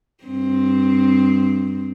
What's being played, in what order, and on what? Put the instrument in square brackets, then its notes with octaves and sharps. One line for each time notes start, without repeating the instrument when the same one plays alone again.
[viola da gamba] G2 C4